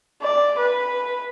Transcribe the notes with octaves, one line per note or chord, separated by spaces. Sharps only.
D5
B4